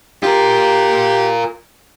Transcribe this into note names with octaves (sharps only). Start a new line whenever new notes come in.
F4 G4 A#4